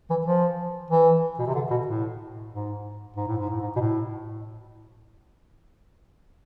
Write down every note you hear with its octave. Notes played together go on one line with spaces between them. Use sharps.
E3
F3
E3
B2
C3
D3
B2
A2
G#2
G#2
A2
G#2
A2
G#2
B2
A2